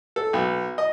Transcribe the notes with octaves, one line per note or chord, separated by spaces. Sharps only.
A4
B1
D#5